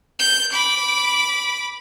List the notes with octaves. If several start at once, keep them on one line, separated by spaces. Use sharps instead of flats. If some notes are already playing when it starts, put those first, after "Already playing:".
G6
B5 D6